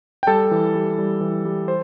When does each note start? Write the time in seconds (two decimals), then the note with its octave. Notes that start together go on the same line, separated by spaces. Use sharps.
0.23 G5
0.27 G3 A4 A5
0.51 E3
0.75 G3
0.99 G3
1.21 E3
1.45 G3
1.68 C5